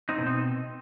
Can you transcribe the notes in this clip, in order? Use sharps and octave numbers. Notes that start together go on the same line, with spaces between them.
C4 D#4
B2
C4 D#4